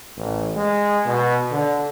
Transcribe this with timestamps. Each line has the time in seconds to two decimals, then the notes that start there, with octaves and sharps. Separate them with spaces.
0.17 A1
0.56 G#3
1.06 B2
1.51 D3